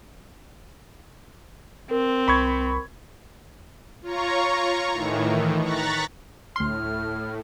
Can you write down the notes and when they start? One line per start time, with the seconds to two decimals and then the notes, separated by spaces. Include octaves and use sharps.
1.91 C4 A#4
2.28 C2 B5 C#6 G#6
4.02 F4 C#5 A#5 C#6
4.94 A2 D#3 E3
5.61 A#5 C#6 F#6 A6 B6
6.56 D2 A2 C6 F6